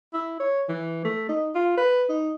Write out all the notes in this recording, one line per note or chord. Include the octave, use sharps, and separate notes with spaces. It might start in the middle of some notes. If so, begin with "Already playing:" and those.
E4
C#5
E3
A3
D#4
F4
B4
D#4